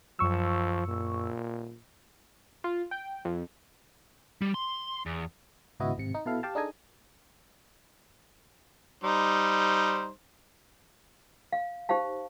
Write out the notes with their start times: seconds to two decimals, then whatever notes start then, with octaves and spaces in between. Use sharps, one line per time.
0.19 F#2 F3 C#6 E6
0.88 A#2
2.64 F4
2.91 G5
3.25 F2
4.41 G3
4.54 C6
5.06 E2
5.80 G#1 C#2 B3 E4 F#4 D#5
5.98 G#1 C3 C#7
6.14 D#4
6.26 B2 E4 A4 F5
6.43 G4 F5 G5 A5
6.55 D4 D#4 G#4 A4 D#5 G#5
9.04 G3 D#4 C5
11.52 F5
11.89 D#4 G4 C5 F5 A5